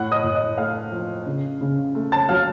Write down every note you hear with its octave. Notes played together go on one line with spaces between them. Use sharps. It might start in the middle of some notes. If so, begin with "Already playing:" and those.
Already playing: A2 F#5 F#6
D#5 D#6
A2
D#5 D#6
A3 F5 F6
F3
C#3
C#3
A3
A5 A6
F#3 F5 F6